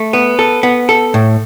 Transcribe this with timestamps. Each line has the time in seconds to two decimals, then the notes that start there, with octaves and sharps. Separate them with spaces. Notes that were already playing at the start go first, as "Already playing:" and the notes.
Already playing: A3
0.13 B3
0.39 A4
0.63 B3
0.89 A4
1.14 A2